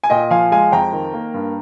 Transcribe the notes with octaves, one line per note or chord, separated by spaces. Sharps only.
G#5
A#2 D#5 G5
F3 F5 G#5
G#3 F5 G#5
F2 G5 A#5
D#3
A#3
G2